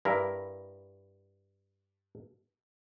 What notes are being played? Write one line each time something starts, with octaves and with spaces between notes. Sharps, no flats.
G2 E4 A#4